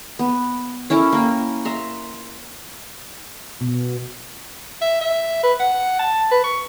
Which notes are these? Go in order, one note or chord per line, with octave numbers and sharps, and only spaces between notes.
B3
C#4 E4 A4 A#4
A#3 A#4 G5
E5 A#5 C6
B2
E5
E5
B4
F#5
A5
B4
C#6